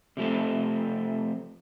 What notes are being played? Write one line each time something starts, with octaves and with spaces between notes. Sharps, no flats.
C3 F3 A3 C4